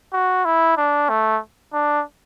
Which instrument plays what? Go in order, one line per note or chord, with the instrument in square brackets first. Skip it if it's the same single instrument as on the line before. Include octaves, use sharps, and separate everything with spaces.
[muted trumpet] F#4
E4
D4
A3
D4